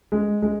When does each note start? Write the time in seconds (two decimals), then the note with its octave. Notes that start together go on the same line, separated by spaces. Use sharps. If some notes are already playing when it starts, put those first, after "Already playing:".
0.12 G#3
0.42 G#3